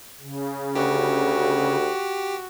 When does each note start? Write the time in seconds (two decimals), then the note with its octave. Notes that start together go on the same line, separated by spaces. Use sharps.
0.20 C#3
0.75 D2 F#4 G4